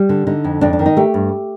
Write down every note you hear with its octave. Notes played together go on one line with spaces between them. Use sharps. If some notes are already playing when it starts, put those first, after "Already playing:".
Already playing: G3
D3
D3 D#4
F2
F2 D4
D4
D#3
D#4
A3 G4
G2